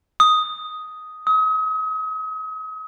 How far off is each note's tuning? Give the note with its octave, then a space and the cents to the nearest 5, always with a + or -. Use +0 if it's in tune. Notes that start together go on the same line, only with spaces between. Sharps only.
D#6 +5
D#6 +40